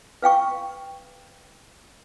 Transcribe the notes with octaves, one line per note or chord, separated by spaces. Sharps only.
B4 F5 G5 C#6